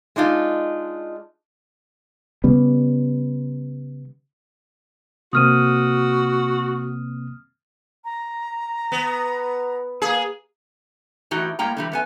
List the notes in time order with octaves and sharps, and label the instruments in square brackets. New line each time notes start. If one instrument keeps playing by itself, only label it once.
[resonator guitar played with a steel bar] G#3 D4 D#4 F4
[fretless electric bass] C#3 G3 B3
[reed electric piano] C3 A#3 C4 [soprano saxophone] F#4 [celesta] D#6 F6 D#7
[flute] A#5
[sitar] B3
A#3 G#4
[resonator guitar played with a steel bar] A2 E3 D#4 F#4 G4
A2 G3 A#3 G5 A#5
D3 E3 G3
F#2 B3 G#5